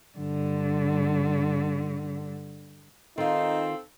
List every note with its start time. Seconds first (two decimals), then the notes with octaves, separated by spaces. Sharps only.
0.18 G2 D3
3.18 D#3 C4 D#4 F4 A4